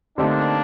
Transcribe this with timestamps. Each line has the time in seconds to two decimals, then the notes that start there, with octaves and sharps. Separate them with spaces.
0.18 D3 A3 A#3 C4 D4 D#4 G4